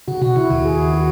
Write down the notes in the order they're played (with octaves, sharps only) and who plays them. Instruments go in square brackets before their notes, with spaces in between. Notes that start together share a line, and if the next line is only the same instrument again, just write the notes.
[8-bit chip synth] C#3 [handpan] F#4
[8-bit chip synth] B2 [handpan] F#4
[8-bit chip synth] C#3 [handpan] E4
[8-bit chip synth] D#2 D#3 [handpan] F#4
[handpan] G#4
F#4